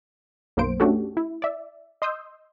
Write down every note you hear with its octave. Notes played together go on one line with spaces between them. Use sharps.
B1 F#2 A#3 B3 C5 D7
A3 C#4 D4 F#4 G4 A4
E4
D5 E5
D#5 C6 D#6 E6 G6